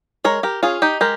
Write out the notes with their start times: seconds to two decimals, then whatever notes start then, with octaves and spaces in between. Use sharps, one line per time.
0.24 G#3 A#4 C#5
0.43 G4 A#4
0.63 C#4 F4 G#4
0.82 D#4 G4
1.01 G#3 G4 A#4